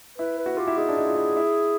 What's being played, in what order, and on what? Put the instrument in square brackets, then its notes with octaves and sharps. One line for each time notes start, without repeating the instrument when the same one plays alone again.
[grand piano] E4 [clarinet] B4
[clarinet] B4
[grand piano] F#4
[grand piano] F4 [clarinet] G4
[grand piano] E4
[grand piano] D#4 [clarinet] G#4
[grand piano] D4
D#4
F4
E4
E4